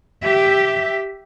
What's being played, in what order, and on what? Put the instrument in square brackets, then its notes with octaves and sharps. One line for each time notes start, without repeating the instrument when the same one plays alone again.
[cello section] G4 E5